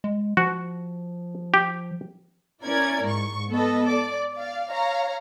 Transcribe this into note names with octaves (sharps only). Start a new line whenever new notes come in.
G#3
F3 F#4
G4
C#4 E4 A#4 D5 G#6
G#2 C#6
B3 A4 B4 D#5
D5 D6
D5 F5
C#5 F5 A#5